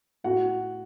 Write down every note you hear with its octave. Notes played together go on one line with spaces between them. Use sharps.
A2 F#4 F#5